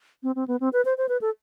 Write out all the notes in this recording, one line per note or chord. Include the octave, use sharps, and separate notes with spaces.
C4
C4
B3
C4
B4
C5
C5
B4
A4